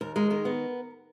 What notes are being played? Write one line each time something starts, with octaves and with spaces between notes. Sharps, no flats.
D#2 A#4
G#3 A#4
D#3 A#4
B3